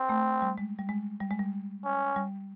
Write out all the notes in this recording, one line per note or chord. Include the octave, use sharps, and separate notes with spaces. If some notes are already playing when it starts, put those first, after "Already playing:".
Already playing: C4
A3
G3
G#3
G3
G#3
G3
G#3
G3
C#4
G3